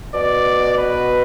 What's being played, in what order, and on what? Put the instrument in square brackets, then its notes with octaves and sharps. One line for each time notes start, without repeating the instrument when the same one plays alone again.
[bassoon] B2 [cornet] D5
[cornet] B4